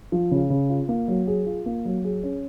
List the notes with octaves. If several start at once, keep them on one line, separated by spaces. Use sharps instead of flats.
F3
C#3
C#3
F4
A#3
F#3
G#4
F4
A#3
F#3
G#4
C#4